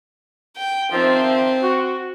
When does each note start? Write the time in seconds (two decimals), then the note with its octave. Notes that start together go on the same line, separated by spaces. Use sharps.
0.57 G5
0.91 D#3 F3 C4 E5
1.61 F#4